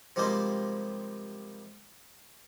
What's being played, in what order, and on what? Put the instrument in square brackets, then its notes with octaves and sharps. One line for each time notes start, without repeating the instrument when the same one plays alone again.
[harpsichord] C3 F3 G3 G#3 A#3 C5